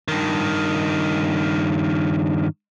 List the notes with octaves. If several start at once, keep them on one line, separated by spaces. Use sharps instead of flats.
G2 D#3